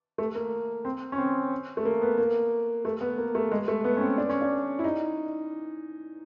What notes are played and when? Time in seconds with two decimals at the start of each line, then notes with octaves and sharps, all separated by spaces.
0.18 A3
0.35 A#3
0.85 C4
1.12 C#4
1.18 C4
1.77 A3
1.85 A#3
2.02 B3
2.18 A#3
2.85 A3
3.01 B3
3.18 A#3
3.35 A3
3.52 G#3
3.68 A3
3.84 B3
3.97 C#4
4.01 C4
4.18 D4
4.30 C#4
4.42 D4
4.79 E4
4.84 D#4